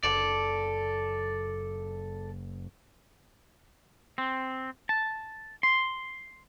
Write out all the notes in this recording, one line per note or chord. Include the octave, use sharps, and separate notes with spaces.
F#1 A4 D5
C4
A5
C6